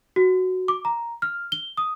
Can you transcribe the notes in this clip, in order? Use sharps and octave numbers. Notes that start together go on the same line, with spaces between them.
F#4
D6
A#5
F6
G7
D#6